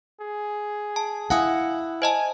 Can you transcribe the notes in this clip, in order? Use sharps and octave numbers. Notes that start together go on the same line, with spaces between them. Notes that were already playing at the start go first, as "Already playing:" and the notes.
G#4
A5
E4 F5 F#5 G#5 D#6
C5 D#5 G#5 A5